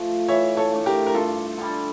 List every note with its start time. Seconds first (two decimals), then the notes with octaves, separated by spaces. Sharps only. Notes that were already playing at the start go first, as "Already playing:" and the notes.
Already playing: F3 A3
0.28 E3 C#5 E5
0.57 A4 C#5
0.72 A3 D4
0.86 G4 A#4
1.07 A#4
1.14 G2 F4 A4
1.58 D3 G3